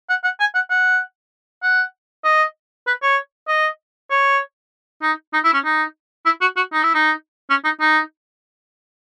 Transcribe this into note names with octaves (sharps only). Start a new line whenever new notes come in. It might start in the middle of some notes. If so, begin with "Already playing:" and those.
F#5
F#5
G#5
F#5
F#5
F#5
D#5
B4
C#5
D#5
C#5
D#4
D#4
E4
C#4
D#4
E4
F#4
F#4
D#4
E4
D#4
C#4
D#4
D#4